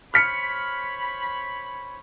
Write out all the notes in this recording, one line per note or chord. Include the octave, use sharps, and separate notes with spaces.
C5 C#5 B5 F6 B6 C#7